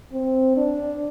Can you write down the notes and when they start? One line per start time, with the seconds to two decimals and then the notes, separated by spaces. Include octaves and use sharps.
0.13 C4
0.57 D4